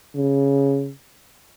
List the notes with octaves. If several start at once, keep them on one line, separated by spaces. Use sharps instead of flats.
C#3